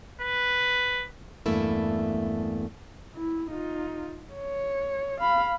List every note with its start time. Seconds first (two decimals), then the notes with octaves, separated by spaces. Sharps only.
0.21 B4
1.46 E2 G2 A3 A#3 E4
3.15 E4
3.51 D#4 F4
4.34 C#5
5.21 F5 B5